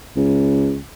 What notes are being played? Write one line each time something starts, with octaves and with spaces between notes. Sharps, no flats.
C#2